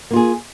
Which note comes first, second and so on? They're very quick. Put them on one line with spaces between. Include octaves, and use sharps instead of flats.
A#3 F4 G#4